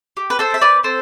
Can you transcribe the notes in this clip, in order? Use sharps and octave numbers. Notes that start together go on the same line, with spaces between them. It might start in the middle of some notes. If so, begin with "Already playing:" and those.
G4
B4
A4 C5
C4 E5
B4 D5
C4 A4 C5